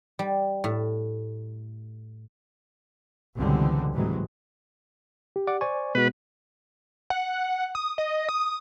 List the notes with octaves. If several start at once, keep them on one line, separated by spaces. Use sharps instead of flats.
G3
A2
C#2 B2 D3 E3 G3 C4
G#1 A2 C3 E3 F#3 G#3
G4
D5 F#5 D6
C5 D5 G#5 C#6
B2 G#3 B3 F#4 B4
F#5
D#6
D#5
D#6